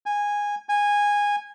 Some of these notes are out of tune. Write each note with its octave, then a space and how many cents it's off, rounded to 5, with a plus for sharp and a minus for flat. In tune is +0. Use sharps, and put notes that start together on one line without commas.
G#5 -15
G#5 -15